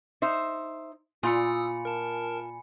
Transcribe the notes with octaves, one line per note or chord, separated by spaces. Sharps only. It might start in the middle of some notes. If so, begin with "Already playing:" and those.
D#4 C5 E5
A#2 F4 G#5 B5 D#6 E6 C#7
A#4 A5